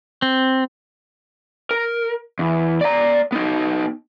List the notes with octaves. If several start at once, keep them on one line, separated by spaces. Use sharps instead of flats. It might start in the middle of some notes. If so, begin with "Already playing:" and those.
C4
A#4
E2
D5 A#5
B3 D#4